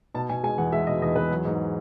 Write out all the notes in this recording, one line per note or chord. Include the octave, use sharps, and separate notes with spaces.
B2 A5
B2 G#5
G#3 G#5
E2 F#5
G#3 E5
B2 D#5
E2 D#5
E2 B4
F#3
G#2